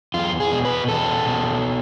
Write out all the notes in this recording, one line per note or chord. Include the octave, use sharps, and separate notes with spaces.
E2 F4
G#4
B2
B4
E2 A4
B2